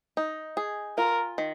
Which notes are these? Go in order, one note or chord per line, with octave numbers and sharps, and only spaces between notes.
D#4
G#4
F4 A#4
D#3